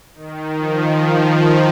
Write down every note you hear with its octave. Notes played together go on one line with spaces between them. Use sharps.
D#3
F3
D#3
F3